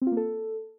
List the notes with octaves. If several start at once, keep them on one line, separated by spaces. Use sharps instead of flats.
C4
F4
A#3
A4